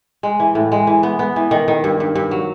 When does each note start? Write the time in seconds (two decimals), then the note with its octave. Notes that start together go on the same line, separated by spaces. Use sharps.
0.23 G#3
0.40 E3
0.55 A2
0.72 G#3
0.87 E3
1.03 B3
1.19 B3
1.36 E3
1.51 D#3
1.68 D#3
1.84 G2
2.00 G2
2.15 G2
2.31 F#3